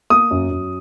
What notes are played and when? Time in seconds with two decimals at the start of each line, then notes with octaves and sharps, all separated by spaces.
0.10 A#3 D#6
0.31 F#2
0.51 F#2